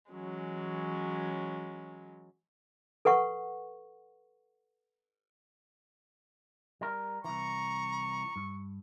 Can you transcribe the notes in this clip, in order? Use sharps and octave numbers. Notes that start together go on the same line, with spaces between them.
E3 F#3 G#3 C#4
A4 B4 F#5 C#6
G3 A#4
C2 E3 A#5 C#6
G2